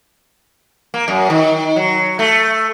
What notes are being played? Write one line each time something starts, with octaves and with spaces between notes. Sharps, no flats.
A#3
F#2
D#3
F#3
A3